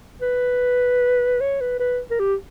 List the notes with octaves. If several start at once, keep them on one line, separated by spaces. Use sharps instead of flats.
B4
C#5
B4
B4
A#4
G4